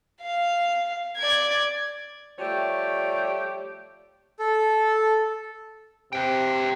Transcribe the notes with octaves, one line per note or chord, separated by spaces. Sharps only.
F5
D5 G#6
F3 G3 A3 G4 C#5
A4
C3 B4 G5